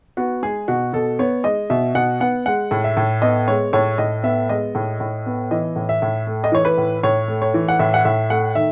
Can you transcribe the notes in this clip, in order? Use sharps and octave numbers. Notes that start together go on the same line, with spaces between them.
B3 F#4
G#3 G#4
B2 F#4
B2 A4
B3 C#5
G#3 D#5
B2 E5
B2 F#5
B3 F#5
G#3 F#5
A2
E5
A2
B3 D#5
G#3 C#5
A2 C#5
A2 D#5
B3 E5
G#3 D#5
A2
A2
B3
E3 D#5
A2
E5
A2
A3
D#5
E3 C#5
B4
A2
A2 C#5
A3
C#5
E3
F#5
A2 E5
F#5
A2 E5
A3 F#5
D#3 E5